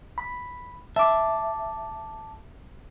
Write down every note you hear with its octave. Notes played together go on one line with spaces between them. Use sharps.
B5
E5 A5 D6